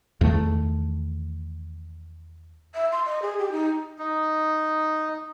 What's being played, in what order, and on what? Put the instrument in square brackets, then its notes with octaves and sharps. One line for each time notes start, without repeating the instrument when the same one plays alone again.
[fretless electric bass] E2 D#3 A3
[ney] E5
C6
D#5
G#4
G4
D#4
[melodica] D#4